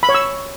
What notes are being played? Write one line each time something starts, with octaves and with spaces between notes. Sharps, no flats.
B5
C#5
E6